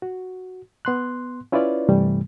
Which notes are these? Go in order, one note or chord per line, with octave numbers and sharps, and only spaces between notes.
F#4
B3 C6 F#6
C#4 E4 F4 B4 C#5 D5
G2 C3 E3 G3 A3